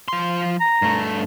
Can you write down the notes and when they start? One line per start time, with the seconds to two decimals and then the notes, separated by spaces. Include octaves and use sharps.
0.08 F3 C6
0.60 A#5
0.82 G2 A3